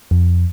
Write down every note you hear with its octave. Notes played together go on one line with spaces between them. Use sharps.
F2